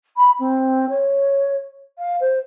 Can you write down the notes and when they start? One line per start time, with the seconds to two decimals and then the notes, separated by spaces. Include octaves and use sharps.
0.16 B5
0.39 C4
0.89 C#5
1.98 F5
2.20 C5